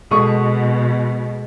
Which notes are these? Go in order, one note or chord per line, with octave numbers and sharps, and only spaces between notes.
B2 G#3 A4 C#6 D#6